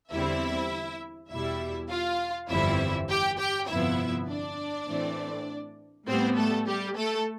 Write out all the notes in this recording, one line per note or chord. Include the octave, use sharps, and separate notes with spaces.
E2 D3 G3 C4 E4 E5
E2 B2 G3 E4 E5
F4 F5
G1 F2 E3 G3 C4 E4 E5
G4 G5
G4 G5
G1 F2 C3 F3 B3 E4 E5
D4 D5
A2 E3 A3 C4
A2 G3 B3 C4 C5
A3 A4
G3 G4
A3 A4